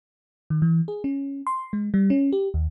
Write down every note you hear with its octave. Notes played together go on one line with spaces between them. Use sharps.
D#3
E3
G#4
C#4
C6
G#3
G3
C#4
G4
D#2